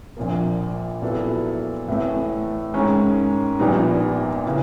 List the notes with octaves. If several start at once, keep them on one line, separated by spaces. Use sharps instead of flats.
A#1 A#2 F3 A#3
A#2 F#3 B3 E4 A4
A2 E3 A3
G#2 D#3 G#3 C#4
A#1 A#2 G3 B3 D#4
C#3 E3